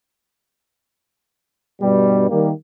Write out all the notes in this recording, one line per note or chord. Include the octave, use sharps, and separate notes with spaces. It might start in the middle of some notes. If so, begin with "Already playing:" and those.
G2 B2 G3
D#3 G3 A#3 G4